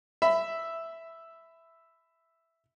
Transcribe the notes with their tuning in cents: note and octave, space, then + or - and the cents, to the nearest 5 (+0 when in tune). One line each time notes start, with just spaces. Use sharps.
E5 +0 B5 +20